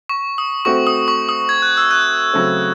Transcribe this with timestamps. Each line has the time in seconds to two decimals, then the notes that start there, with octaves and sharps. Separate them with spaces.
0.09 C#6
0.38 D#6
0.65 A3 C4 F#4 C#6
0.87 D#6
1.08 C#6
1.29 D#6
1.49 G#6
1.62 F#6
1.77 E6
1.91 F#6
2.33 C#3 F#3 A3 C4